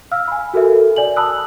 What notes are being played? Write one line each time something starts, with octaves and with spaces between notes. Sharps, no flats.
F5 E6 F6
G#5 B5
F#4 A4 A#4 E5
D5 G#5 F#7
A5 B5 D#6 E6 F#6